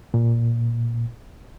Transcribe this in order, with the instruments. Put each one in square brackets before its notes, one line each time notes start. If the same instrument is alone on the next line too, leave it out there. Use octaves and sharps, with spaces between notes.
[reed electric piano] A#2